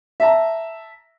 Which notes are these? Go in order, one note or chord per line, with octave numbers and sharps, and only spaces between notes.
E5 A5 A#5